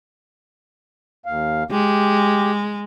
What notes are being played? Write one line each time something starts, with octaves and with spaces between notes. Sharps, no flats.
D#2 F5
G#3 G4